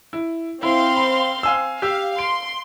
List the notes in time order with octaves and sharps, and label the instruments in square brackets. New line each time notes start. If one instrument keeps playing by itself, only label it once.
[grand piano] E4
[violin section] C4 F5 C6 [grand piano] E4
[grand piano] B5
F5 G#5 E6
[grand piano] G4 E6 [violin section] F5
[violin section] C6 [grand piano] D7